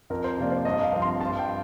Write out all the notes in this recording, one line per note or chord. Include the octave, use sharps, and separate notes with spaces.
F2 A#4
C5
C3 F3 A#3 D5
C5
G2 D#5
F5
F3 C4
C6
G2 A5
G5